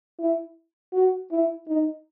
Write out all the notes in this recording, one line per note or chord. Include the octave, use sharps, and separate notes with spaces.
E4
F#4
E4
D#4